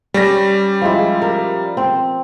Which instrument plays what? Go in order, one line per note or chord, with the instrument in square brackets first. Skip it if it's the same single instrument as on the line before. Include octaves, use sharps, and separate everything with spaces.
[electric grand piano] G3 A#6 [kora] C#4
[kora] F3 G#3 E4
A#4
C4